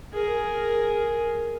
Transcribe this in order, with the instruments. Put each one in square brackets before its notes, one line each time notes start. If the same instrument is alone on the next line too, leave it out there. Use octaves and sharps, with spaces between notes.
[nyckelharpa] G#4 A#4